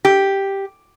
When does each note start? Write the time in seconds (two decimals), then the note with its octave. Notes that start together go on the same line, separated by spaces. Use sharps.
0.05 G4